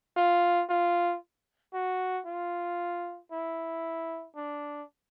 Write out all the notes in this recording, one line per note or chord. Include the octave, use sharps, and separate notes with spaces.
F4
F4
F#4
F4
E4
D4